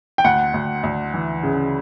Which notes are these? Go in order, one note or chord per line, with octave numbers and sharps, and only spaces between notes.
G5
D2 F#5
D2
D2
E3
C#3